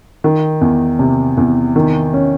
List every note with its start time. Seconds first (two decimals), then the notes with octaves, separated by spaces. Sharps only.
0.24 D#3
0.61 E2
0.99 C3
1.37 E2
1.76 D#3
2.14 C#4